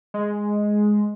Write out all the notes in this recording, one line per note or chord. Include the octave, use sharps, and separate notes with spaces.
G#3